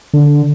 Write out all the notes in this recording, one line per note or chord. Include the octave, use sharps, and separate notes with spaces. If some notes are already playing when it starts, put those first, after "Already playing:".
D3